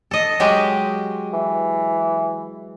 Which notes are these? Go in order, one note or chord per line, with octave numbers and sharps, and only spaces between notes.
A4 D#5
F#3 G#3 G4
E3